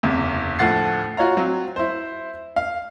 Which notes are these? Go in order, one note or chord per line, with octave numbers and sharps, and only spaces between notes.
F#1 E2 C3
D2 A2 F3 F#5 A6 C7
F4 F#4 C#5 F5 A#5
F#3 C4
E4 C5
F5